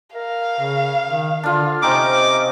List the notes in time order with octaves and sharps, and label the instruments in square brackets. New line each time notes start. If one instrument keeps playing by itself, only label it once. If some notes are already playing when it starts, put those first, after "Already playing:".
[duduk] A#4 [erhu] F5
[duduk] C#3
D#3
[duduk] D3 [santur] D4 F4
[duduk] C3 [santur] C4 C#4 D#4 [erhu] D#5 [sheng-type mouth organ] D6